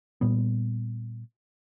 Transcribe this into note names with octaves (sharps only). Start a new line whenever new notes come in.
A#2 G3 B3